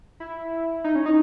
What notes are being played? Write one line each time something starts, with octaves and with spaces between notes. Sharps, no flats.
E4
D#4
C#4
D#4